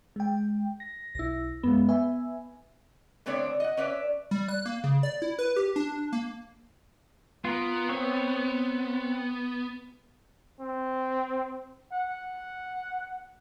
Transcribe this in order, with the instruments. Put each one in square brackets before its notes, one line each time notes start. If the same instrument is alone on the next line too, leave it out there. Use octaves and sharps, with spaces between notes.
[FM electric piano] G#3 G5
A#6
[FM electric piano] B1 [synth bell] E4 A#6
[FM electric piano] F#2 G#3 [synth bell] B3
[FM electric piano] B4 E5 G#5
[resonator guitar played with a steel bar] D3 A3 B3 C4 C#5 D5
D#5 F#5
C#4 B4 D5 E5
[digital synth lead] G3
F#6
A#3
C#3
D5
E4
B4
G4
D4
A#3
[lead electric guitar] B3 [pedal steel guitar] F4 A#4
[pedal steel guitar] C4 C#5
[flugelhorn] C4
F#5